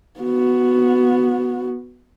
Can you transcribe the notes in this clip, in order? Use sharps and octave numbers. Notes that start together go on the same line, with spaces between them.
B3 F#4